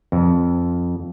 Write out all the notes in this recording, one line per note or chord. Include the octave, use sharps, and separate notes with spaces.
F2